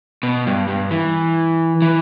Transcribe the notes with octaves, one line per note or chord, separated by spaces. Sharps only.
B2
G2
G2
E3
E3